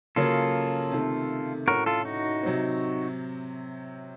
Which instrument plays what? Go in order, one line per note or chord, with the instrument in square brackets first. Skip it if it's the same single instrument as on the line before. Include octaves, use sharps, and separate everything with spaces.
[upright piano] C#3 F#3 A#3 C#4 [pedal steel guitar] F4 A4
[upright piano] C3 D#3 A3
[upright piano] A2 A3 C#4 [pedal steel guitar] F#4 A#4
[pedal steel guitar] F4 A4
D#4 F#4
[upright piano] C3 F#3 C4